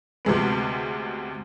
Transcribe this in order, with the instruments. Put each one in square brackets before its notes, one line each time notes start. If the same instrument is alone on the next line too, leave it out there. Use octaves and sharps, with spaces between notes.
[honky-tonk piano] D2 C3 G#3 B3